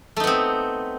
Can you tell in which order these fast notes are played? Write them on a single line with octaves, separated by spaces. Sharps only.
A3 D#4 B3 C4